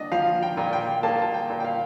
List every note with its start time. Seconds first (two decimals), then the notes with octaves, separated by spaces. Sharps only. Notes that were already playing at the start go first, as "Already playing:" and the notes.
Already playing: D4 D#5
0.12 F3 F5
0.42 G5
0.57 A#2
0.73 G5
1.03 A#3 A5
1.22 A5
1.34 G5
1.50 A#2
1.60 G5
1.65 F5